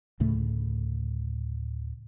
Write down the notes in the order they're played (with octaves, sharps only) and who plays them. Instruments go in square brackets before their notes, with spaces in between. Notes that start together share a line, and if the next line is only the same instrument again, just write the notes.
[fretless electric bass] D2 A2 C#3 A3